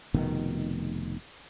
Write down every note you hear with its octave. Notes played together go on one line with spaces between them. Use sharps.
F1 B2 D#3